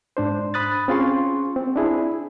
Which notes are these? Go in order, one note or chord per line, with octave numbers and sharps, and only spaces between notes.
G#2 D4 C5
B5 D#6 F#6 A6
C4 C#4 F4 G#4 C6 C#6
C4
D4 E4 G#4